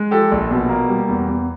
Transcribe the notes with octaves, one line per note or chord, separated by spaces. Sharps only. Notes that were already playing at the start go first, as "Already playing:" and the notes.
Already playing: G#3
F3 G4 A4
A#1
B2
A#3
G3
E2
E2